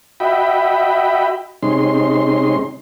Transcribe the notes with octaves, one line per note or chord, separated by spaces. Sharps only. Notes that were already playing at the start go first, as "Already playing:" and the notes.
F#4 D#5 E5 G5 B5
C3 G#3 C#4 D#4 C6